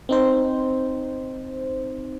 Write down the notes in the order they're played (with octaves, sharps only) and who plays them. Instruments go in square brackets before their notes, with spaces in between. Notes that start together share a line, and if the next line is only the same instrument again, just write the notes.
[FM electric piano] C4 D#4 C5